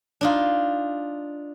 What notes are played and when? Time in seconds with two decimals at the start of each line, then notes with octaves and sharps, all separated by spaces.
0.21 D4 D#4 F4